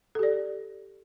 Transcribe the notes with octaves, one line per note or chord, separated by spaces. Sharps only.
G4 A4 D5